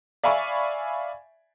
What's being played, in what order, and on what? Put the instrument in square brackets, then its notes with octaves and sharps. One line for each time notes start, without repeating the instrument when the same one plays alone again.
[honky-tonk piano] D5 E5 F5 G#5 B5 C#6